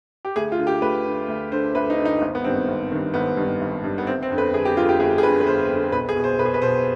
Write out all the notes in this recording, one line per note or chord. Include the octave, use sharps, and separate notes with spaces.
G4
D2 G#4
F4
D3
G4
D2 B4
D3
D2
D3 C5
D2 B4
D#4
D3
D#4
G#1
B3
G2 D#3 C4
G#1
G2 D#3
G#1 B3
G2 D#3
G#1
G2 D#3
B3
G1 C4
C4
F2 D3
B4
G1 G#4
G4
F2 D3 F4
G4
G1 G#4
G#4
F2 D3 B4
B4
G1 C5
F2 D3
B1 B4
G#4
B2
C5
B1 B4
G#4
B4
B2 C5